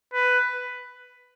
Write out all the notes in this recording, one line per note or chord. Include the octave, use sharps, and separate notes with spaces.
B4